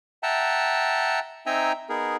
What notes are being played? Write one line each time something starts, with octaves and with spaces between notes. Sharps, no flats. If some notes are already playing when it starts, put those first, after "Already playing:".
E5 F#5 G5 A5 A#5
C4 D#4 E5 G5 G#5 A#5
B3 D#4 G#4 A#4